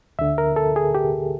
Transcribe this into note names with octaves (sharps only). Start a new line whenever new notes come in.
D2 D3 E5
A#4
A4
G#4
G4